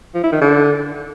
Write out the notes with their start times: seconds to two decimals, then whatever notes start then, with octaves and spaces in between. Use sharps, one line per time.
0.14 F3
0.23 E4
0.32 D#3
0.41 D3